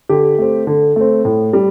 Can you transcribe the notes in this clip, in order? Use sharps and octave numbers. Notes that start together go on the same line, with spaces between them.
D3 G4
A3 C4
D3
A3 C4
A2
G3